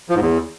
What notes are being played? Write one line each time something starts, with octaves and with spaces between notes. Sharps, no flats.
F3
G#2
E2